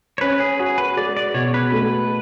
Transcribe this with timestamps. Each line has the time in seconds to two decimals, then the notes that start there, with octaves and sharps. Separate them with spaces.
0.18 C#5
0.21 C#4 B4
0.40 G#4
0.59 F#4 G#4
0.78 B4
0.97 G#3 D5
1.17 D5
1.34 B2 C#5
1.54 B4
1.72 A3 B4